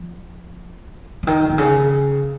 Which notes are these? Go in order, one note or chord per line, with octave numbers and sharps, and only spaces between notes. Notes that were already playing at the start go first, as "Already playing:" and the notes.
Already playing: F3
C#3
D#3
B2
C#3